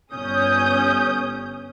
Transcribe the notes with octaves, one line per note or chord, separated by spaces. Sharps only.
G1 C#4 D#6 G6